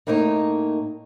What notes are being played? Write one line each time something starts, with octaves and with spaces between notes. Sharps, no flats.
A2 A#3 D#4 A#4 C#5